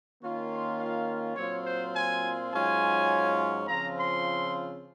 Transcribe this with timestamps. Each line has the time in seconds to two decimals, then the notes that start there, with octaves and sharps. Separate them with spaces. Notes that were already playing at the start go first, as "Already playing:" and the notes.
0.21 D#3 A#3 C#4 F4
0.51 C6
0.79 F5
1.37 A#2 F#3 C4 F4 C#5
1.66 C5
1.95 G#5
2.53 G#2 F#3 C#4 F4 G#5
3.68 C#3 F3 C4 F4 A#5
3.97 C6